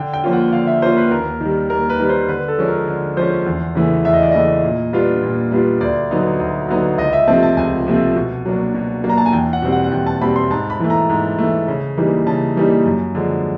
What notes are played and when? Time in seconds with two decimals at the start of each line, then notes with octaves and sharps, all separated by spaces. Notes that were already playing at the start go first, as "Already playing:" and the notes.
Already playing: D3 G5
0.14 G5
0.24 F3 A#3 C#4 F4
0.33 F#5
0.52 D3 F5
0.67 E5
0.82 F3 A#3 C#4 F4 C5
0.97 B4
1.11 D#2 A#4
1.41 D#3 G3
1.70 D#2 A#4
1.90 B4
2.00 D#3 G3 B4
2.09 C5
2.29 D3 B4
2.48 A4
2.58 F3 G#3 C#4
2.68 A#4
2.87 D3
3.17 F3 G#3 C#4 C5
3.46 E2
3.75 C#3 E3 A3
4.05 E2 E5
4.13 D#5
4.23 D5
4.31 C#3 E3 A3 D#5
4.63 A#2
4.93 G3 B3 D4 F4
5.23 A#2
5.51 G3 B3 D4 F4
5.81 D2 D5
6.11 D3 F#3 B3 D#4
6.40 D2
6.69 D3 F#3 B3 D#4
6.98 C#2 D#5
7.13 E5
7.28 C3 F3 A3 C4 A5
7.43 A5
7.57 C#2 G#5
7.87 C3 F3 A3 C4
8.16 B2
8.46 F#3 A#3 D4
8.74 B2
9.04 F#3 A#3 D4
9.10 A#5
9.18 A5
9.26 G#5
9.33 E2 G5
9.53 F#5
9.62 B2 G3 C4
9.72 F#5
9.84 F#5
9.92 E2 G5
10.06 A5
10.21 B2 G3 C4 B5
10.36 C6
10.50 G#2 A5
10.70 B5
10.80 E3 A3
10.90 A#5
11.10 G#2
11.38 E3 A3
11.68 C#3
11.97 E3 G3 A#3 D#4
12.26 C#3 A5
12.57 E3 G3 A#3 D#4
12.85 F#2
13.15 D3 F3 G#3